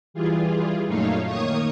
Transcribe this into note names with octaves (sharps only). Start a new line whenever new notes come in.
E3 G3 F4 G#4
F#2 A#2 A3 D#4 C#5 F5
D#3 A#3 C#5 C#6 D#6